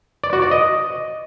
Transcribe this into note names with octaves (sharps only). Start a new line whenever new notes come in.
D5
F#4
D5
D#5